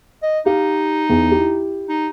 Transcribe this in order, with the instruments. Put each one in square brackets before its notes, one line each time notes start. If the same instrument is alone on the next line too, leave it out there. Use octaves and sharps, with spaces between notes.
[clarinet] D#5
[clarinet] D#4 [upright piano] G4 F5
[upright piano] E2
E4 G4
[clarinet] D#4